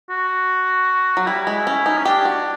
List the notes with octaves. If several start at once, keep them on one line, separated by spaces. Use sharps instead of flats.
F#4
F#3
G3 E4
G#3
C#4
D#4
C#4
D4 G4
F#4